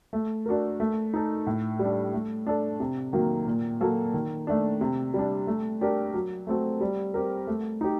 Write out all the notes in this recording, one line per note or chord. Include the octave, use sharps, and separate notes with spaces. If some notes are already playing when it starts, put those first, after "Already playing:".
A3
D4 F#4 A#4
A3
D#4 A4
A2
G3
D4
A3
D4 A4
C3
D#3 F#3 A#3
A#2
F#3 A#3 F#4 A4
D#3
A3 D4
C3
G3 D4
A3
D4 G4 A#4
F#3
A3 C4 F#4 A4
G3
C4 G4 A#4
A3
D#4 G4